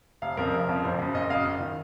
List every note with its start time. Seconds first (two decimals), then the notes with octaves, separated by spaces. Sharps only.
0.22 F1 F5
0.37 F2 C#3 F3 A#4
0.53 F1
0.69 F2 C#3 F3
0.84 F#1 C5
0.99 F#2 C#3
1.14 F#1 D#5
1.30 F#2 C#3 F5
1.45 F#1
1.60 D#3